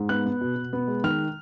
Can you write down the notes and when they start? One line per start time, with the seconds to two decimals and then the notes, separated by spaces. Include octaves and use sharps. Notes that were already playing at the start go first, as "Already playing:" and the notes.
Already playing: G#2
0.09 B3 F#6
0.26 B3
0.41 B2
0.56 B2
0.73 B3
0.88 G#3
1.04 D#3 F6